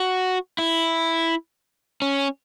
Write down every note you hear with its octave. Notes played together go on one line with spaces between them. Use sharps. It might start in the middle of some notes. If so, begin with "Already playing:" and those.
Already playing: F#4
E4
C#4